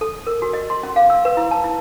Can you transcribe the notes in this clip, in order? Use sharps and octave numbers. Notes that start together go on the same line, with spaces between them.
A4
A#4
F#4
D#5
C6
C#4
F5
E6
B4
E4
A5
E4